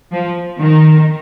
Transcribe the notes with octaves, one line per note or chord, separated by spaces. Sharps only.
F3
D#3